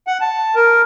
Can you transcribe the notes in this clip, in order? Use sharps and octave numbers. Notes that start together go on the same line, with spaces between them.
F#5
A5
A#4